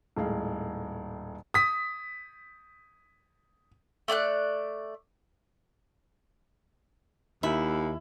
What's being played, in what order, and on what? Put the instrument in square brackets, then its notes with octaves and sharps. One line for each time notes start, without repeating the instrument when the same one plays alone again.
[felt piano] D#1 A2 G#3 F5
[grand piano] D#6 B6
[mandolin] A3 D5 G#5 F#6
[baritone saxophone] D#2 [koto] E4